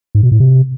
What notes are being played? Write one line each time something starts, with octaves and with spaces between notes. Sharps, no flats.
G#2
B2
A2
C3